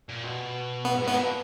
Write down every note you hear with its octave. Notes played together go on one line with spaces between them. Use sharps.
A#2
B2
B3
G#2
A2
B3
A#2
B2